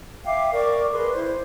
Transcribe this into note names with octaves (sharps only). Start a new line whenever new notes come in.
E5 F5 G5 D6
A#4 D5 C#6 D6
G#4 A#4 B4 C6
E4 C5